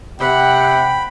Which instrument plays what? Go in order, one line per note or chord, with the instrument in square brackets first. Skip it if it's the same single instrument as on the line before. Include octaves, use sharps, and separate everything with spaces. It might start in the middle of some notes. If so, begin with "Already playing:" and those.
[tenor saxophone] C3 [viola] F#5 [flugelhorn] G5 [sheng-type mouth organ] B5